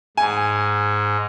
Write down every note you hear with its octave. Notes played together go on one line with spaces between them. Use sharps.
G#2 G#5